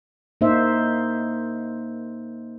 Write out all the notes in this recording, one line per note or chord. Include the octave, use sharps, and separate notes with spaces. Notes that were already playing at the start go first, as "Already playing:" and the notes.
A#3 D#4 C5 E5